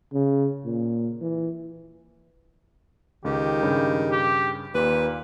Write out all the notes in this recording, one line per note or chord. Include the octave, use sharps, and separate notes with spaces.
C#3
A#2
E3
C#2 D#3 G4
G2 C#3
G4
D#2 A#2 B4